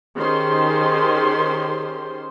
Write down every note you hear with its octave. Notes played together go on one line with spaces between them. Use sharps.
D#3 C#4 G4 G#4 C5 C6